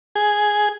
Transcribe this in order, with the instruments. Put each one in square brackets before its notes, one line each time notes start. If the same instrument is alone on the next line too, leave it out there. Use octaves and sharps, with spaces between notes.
[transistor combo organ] G#4